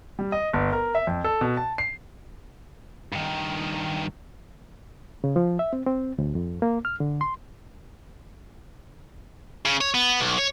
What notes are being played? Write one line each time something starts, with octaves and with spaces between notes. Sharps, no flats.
G3
D#5
G1
A#4
E5
F2
A4
B2
A5
C7
G2 D#3
C#3
F3
E5
C4
C4
D2
F2
A#3
F6
D3
C6
C#3
C#5
B3
B1
C#5